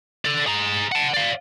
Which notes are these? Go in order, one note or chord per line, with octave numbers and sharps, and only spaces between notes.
A4 D5
G#4 A#5
F#5 A5
D5 F5